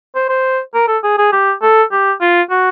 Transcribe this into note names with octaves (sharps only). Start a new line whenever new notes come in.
C5
C5
A#4
A4
G#4
G#4
G4
A4
G4
F4
F#4